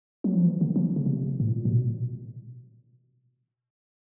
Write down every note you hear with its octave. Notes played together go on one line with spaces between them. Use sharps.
F#3
F3
E3
D3
F3
C#3
C3
A2
A#2
B2